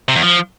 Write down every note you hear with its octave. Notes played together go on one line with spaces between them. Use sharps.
C3
E2
F3